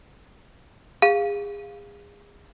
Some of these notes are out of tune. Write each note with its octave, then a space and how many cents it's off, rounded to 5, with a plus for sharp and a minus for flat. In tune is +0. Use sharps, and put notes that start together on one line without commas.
G#4 -30 F5 +0